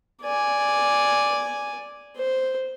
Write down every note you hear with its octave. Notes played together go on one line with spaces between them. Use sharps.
D5 G#5
C5